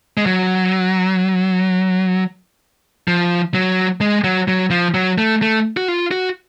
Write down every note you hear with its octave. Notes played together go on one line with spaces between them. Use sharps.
G#3
F#3
F3
F#3
G#3
F#3
F#3
F3
F#3
A3
A3
F#4
F4
F#4